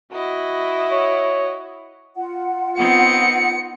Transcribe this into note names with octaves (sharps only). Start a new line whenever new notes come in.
E4 F#4 D#5
C#5
F4 F#5
B3 C4 D#4 C#7